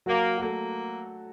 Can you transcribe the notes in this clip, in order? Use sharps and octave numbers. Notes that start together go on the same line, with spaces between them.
F#3 A#3 F#4
F#4
A3 A#3 A4